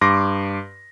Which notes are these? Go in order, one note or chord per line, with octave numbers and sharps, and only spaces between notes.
G2 C6 D6 A#6